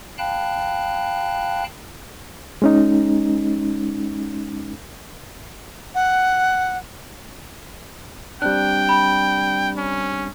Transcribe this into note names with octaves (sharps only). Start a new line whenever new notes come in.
F5 G5 A5 B5 F#6
G#3 C#4 D#4
F#5
G3 C4 D4 G5 F#6
B5
C#4